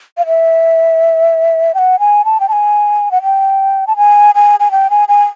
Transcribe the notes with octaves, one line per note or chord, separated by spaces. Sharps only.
F5
E5
G5
F#5
G#5
A5
G5
A5
G#5
F#5
G5
A5
G#5
G#5
G#5
G5
G#5
G#5